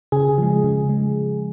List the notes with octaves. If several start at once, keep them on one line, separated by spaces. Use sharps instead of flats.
C#3 G#4
F3 G#3
C#3
G#3